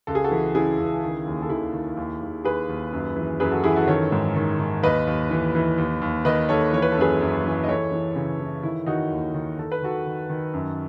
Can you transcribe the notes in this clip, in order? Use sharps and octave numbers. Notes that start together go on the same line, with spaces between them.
C#2 A4
G#4
F#4 A4
E3
C#3 E4 G#4
C#2
D#3
D#2
A4
D#3 E4 G#4
D#3
D#2
D#2
D#2 G#4 B4
D#2
F#2
E3
F#2 G#4 B4
F#4 A4
E3 E4 G#4
F#4 A4
D#3 A4 C#5
G#2
D#3
D#3
D#2 B4 D#5
D#2
E3
E3
D#2
D#2
D#3 B4 D#5
D#2 A4 C#5
E3 C#5
B4
A4
F#2 G#4 B4
F#2
E3
D#5
E3 A4 C#5
E3
C#3
E3
D#3 E4
D#3 D#4 F#4
D#2
D#3
D#3 A4
B4
D#3 F#4 A4
D#3
D#3
F#2